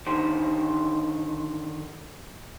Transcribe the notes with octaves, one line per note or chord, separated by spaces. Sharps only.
D3 D#3 G4 C5